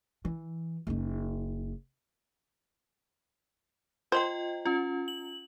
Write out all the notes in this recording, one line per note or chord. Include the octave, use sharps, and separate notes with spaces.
E3
F#1 D#4
F4 C5 D#5 G5
C#4 F4
F#7